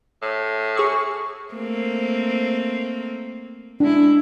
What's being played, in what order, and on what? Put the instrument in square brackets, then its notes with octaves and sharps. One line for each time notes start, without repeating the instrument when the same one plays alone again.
[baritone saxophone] A2
[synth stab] G#4 C#6
[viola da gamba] A3 A#3 C4
[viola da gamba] G#3 E4 [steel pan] D4